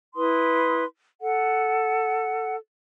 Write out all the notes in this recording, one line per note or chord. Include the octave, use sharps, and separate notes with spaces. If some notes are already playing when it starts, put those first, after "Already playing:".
E4 B4 C6 D#6
A4 F#5